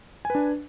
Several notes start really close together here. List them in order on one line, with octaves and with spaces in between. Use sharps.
G#5 B4 D4